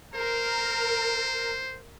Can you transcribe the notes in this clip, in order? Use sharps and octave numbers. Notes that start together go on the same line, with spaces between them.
A#4 C5